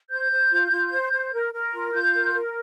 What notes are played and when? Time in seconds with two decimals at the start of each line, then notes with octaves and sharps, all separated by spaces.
0.11 C5 G6
0.31 C5
0.51 F4
0.71 F4
0.92 C5
1.12 C5
1.33 A#4
1.53 A#4
1.74 F4
1.93 F4 G6
2.14 A#4
2.34 A#4